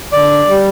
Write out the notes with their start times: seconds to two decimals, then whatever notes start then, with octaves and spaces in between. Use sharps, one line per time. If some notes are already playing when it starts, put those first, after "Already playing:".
0.12 D3 D5
0.48 G3